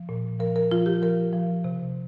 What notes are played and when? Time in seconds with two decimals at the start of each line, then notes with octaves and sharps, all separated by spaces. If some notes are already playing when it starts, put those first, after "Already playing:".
Already playing: F3
0.09 A#2
0.40 F3 A#4
0.56 A#4
0.71 F3 F4
0.86 G4
1.02 F3 A#4
1.33 F3
1.64 C3